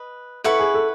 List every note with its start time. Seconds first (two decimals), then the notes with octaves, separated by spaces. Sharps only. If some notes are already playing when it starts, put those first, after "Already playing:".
Already playing: B4 D#5
0.44 E4 A4 B4 F#5 C#6
0.59 G#4
0.74 A4